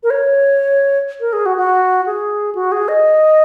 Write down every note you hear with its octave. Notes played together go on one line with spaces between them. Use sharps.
A#4
C#5
A#4
G#4
F#4
F#4
G#4
F#4
G#4
D#5